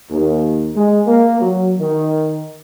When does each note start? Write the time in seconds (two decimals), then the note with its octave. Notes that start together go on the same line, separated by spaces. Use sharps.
0.10 D#2
0.75 G#3
1.06 A#3
1.40 F#3
1.79 D#3